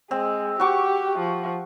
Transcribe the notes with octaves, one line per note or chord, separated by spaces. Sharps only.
G#3 C4
F#4 G4 C#6 D6
F3